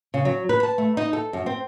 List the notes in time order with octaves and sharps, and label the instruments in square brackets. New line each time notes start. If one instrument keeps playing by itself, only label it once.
[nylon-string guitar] C#3
F#3
B4
A5
A3
D#4
A4
F#2
C4